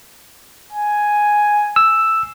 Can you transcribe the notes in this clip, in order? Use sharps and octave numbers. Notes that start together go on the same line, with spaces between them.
G#5
E6